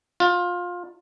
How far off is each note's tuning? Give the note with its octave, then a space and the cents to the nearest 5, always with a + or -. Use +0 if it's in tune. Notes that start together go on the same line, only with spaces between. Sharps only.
F4 +20